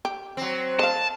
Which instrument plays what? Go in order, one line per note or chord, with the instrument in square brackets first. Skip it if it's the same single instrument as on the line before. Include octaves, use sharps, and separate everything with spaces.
[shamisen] G4
[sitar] F#3 C4
[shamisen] D#5 F5 [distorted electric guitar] A5